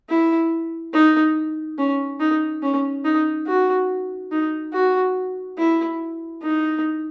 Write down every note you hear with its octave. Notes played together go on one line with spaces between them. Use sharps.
E4
D#4
C#4
D#4
C#4
D#4
F#4
D#4
F#4
E4
D#4